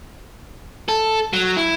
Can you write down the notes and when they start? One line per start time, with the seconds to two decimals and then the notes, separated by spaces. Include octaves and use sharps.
0.89 A4
1.33 F#3
1.57 E4